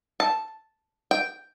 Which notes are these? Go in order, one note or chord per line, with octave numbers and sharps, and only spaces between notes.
A5
G5